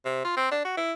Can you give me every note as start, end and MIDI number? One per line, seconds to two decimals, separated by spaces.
0.05 0.24 48
0.24 0.35 65
0.37 0.49 60
0.51 0.64 62
0.65 0.75 66
0.77 0.93 64